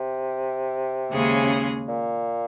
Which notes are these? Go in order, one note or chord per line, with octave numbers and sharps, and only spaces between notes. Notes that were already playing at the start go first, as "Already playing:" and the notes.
Already playing: C3
D#2 C#3 G#3 C#4 G#4
A#2